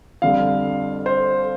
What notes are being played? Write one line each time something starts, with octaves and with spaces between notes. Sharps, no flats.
F2 D3 G3 F5
C5